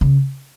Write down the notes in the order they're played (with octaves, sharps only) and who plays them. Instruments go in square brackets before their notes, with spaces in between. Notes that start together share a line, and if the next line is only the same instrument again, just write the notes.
[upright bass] C#3